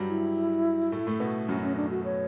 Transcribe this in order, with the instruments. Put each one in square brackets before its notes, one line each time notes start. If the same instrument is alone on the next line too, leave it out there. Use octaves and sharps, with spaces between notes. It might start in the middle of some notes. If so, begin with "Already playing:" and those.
Already playing: [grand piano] G2 F#3 G3
[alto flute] E4
[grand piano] A2 A3
A2 A3
B2 B3
[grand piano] F#2 F#3 [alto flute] C#4
[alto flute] C#4
D4
F#4
C#5